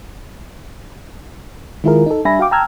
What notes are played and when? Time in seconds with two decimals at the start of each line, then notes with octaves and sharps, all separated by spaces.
1.84 D#3 G#3 E4 F4 G#4 A#4
2.06 D#4 A4
2.25 G3 D4 E5 G#5 B5 A#6
2.39 F#4 F5 G5 D6
2.51 G5 A5 A#5 E6 F6 G#6